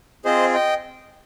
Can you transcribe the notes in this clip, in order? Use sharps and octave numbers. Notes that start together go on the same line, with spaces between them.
C4 F4 G#4 C5 D#5
D#5 G5